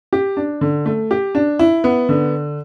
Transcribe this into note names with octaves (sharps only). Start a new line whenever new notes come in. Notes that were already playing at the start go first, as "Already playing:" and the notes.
G4
D4
D3
A3
G4
D4
E4
B3
D3